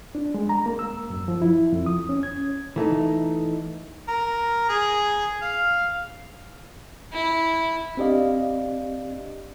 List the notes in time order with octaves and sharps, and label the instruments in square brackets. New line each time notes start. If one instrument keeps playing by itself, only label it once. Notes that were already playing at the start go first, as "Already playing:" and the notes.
[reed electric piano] D4
G#3
A#5
A#3
E6
F#2
F3
E4
F2
D#6
C#4
G#6
[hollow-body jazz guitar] E3 A3 D#4
[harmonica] A#4
G#4
F5
[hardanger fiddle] E4
[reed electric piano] C4 D4 G4 D5 D#5 F5